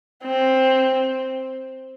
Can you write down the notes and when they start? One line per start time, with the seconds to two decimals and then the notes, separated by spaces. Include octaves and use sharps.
0.24 C4